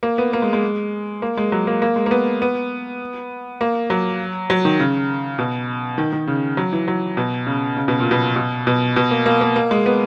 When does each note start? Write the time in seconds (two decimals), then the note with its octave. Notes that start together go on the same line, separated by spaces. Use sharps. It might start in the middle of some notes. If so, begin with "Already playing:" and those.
0.03 A#3
0.18 B3
0.33 A#3
0.42 G#3
0.53 G#3
1.22 A#3
1.37 G#3
1.52 F#3
1.67 A#3
1.82 A#3
1.96 G#3
2.06 A#3
2.11 B3
2.42 B3
3.61 A#3
3.90 F#3
4.50 F#3
4.65 D#3
4.80 C#3
5.39 B2
5.98 D#3
6.13 D#3
6.27 C#3
6.57 F#3
6.73 E3
6.88 F#3
7.17 B2
7.47 C#3
7.77 C#3
7.88 B2
8.00 A#2
8.11 B2
8.36 B2
8.67 B2
8.96 B2
9.11 A#3
9.26 A#3
9.41 A#3
9.56 A#3
9.71 G#3
9.86 B3